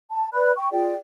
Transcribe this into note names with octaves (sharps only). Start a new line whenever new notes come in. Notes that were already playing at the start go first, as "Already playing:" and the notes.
A5
B4 D5 B5 F#6
G5 C#6
F4 G#4 D5 G5